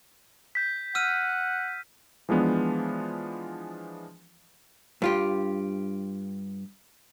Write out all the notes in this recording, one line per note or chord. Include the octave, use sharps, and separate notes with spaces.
G6 B6
F#5 E6 F6 D#7
E3 F3 G#3 B3 D4
G2 F4 G4